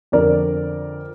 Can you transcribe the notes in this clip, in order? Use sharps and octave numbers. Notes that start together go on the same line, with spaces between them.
F2 D3 A#4 D5